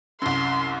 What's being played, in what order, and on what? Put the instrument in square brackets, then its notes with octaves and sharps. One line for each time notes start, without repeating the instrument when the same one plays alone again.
[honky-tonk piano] C2 F#2 [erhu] C6